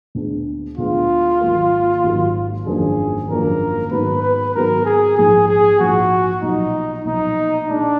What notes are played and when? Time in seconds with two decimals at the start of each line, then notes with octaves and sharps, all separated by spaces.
0.15 D2 D3 G#3 B3 D4
0.78 D2 D3 G#3 B3 D4 F4
1.41 G#1 G#2 F#3 A#3
2.04 G#1 G#2 F#3 A#3
2.66 G#1 F#2 F3 A#3 D4 G#4
3.29 G#1 F#2 F3 A#3 D4 A#4
3.91 G#2 D#3 F#3 B3 B4
4.23 B4
4.55 G#2 D#3 F#3 B3 A#4
4.86 G#4
5.17 A#1 G#2 F3 G#4
5.49 G#4
5.79 A#1 G#2 F3 F#4
6.42 B1 A#2 F3 D#4
7.05 B1 A#2 F3 D#4
7.68 A#2 G#3 D4 D#4